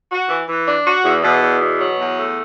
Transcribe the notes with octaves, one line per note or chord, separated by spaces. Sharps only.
F#4
E3
E3
D4
F#4
E2
B2
E2
B2
F#3
E2
A3